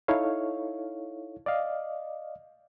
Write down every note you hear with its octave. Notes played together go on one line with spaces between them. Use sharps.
D#4 E4 A4 C#5 F5
D5 D#5 F5